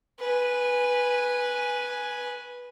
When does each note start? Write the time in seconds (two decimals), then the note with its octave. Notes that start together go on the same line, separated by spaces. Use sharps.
0.20 B4 G#5